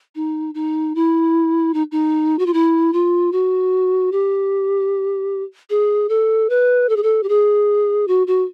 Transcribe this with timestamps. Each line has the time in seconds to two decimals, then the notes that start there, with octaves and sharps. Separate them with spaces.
0.15 D#4
0.54 D#4
0.95 E4
1.74 D#4
1.92 D#4
2.39 F#4
2.46 F4
2.53 E4
2.93 F4
3.32 F#4
4.12 G4
5.70 G#4
6.09 A4
6.50 B4
6.89 A4
6.96 G#4
7.03 A4
7.23 G4
7.29 G#4
8.08 F#4
8.27 F#4